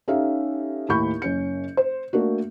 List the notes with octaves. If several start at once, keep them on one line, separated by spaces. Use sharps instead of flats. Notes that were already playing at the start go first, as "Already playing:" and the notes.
C#4 D#4 G4 A4 E5 F5
D#2 A2 D#4 B5 C#6 G6
F#1 C#4 C#7
C5
A3 A#3 D4 F#4